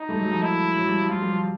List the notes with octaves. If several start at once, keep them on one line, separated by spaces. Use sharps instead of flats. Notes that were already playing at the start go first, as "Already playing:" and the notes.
Already playing: D#4
G3 A3
F#3 G#3
F3 G3
E4
F#3
F3 G3
F3
F#3 F4
F3 G3
F3